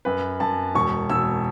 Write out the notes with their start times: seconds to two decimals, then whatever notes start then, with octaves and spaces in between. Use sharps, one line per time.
0.05 F#2 B4
0.40 F#2 A5
0.75 E1 C#6
1.10 E1 E6